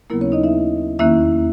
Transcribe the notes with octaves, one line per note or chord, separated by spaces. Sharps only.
D#2 C#3 F#3 A#3 B3 E4 A#4
C#4 C#5
D#4 D#5
E4 E5
E2 D#3 A#3 C#4 E4 E5